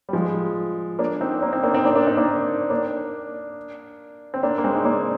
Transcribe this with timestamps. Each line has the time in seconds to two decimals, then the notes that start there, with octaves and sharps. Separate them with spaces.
0.09 G3
0.13 F3 G#3
0.99 A#3 D4
1.20 C4 D#4
1.42 A#3 D4
1.53 C4 D#4
1.63 A#3 D4
1.74 C4 D#4
1.85 A#3 D4
1.96 A#3 D4
2.07 C4 D#4
2.17 A#3 D4
2.70 A#3 D4
4.34 C4
4.43 A#3 D4
4.58 A#3
4.64 G#3 C4
4.75 D#4
4.85 A#3 D4